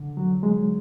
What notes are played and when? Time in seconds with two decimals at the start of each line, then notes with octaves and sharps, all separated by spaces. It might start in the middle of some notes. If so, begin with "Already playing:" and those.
Already playing: D3
0.17 F#3
0.43 G#3